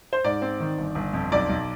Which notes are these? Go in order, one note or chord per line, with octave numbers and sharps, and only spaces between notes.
C5
G#2 D5
C4
D#3
G1
G1
F2
B1 D5
B1